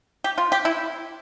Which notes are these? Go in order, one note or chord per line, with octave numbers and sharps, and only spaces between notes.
G4
F4
G4
E4